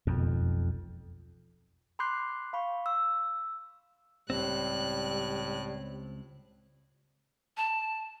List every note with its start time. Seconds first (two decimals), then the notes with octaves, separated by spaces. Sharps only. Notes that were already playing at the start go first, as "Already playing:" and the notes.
0.07 E1 B1 F2
1.99 B5 C6 D6 F#6 G6 C7
2.53 F5 B5 C#6
2.86 E6
4.30 C#2 A2 G3 C4 F#6
7.57 A5